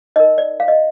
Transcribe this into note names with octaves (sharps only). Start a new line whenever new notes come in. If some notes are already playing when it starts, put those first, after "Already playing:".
D#4 A#4 D#5
D5
F5
D#5